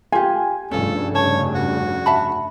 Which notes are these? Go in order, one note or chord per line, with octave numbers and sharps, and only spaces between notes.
F4 G4 G#5
F1 G2 C#3 C#4 F4 A4
C#5 A5
F#4
E5 A5 B5